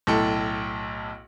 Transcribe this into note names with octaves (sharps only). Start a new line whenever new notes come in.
B1 A2 A4